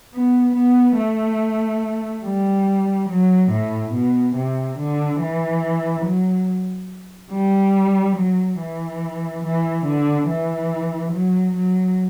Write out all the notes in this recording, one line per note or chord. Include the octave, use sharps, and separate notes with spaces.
B3
B3
A3
G3
F#3
A2
B2
C3
D3
E3
F#3
G3
F#3
E3
E3
D3
E3
F#3
F#3